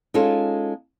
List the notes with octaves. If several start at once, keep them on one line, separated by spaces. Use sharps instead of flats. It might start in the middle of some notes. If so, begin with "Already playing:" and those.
G#3 C#4 D#4 F4 A4